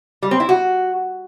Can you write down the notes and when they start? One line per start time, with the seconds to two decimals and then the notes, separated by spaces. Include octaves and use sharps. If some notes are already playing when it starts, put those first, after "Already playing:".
0.23 G3
0.31 C4
0.40 E4
0.49 F#4